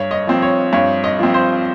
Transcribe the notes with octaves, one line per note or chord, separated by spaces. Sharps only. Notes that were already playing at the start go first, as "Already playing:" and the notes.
Already playing: G2 C#5
D#5
F3 C4
C#5
G2 C#5
D#5
F3 C4
C5